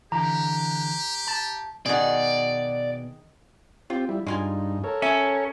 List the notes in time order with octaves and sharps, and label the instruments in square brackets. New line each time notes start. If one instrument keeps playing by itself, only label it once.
[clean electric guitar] D3 E3 [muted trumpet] G4 [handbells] A#5
[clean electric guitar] A5
[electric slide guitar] B2 F#5 [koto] D#3 G#4 [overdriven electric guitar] D5
[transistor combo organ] C4 G4 [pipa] F4
[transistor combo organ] G3 E4
[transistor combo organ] G2 D#4 [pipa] G#3 F4 G#5
[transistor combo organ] A4 A#4 C#5
[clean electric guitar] C#4 [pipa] E5